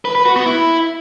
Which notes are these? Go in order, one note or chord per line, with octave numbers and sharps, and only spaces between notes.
B4
B4
F#4
B3
E4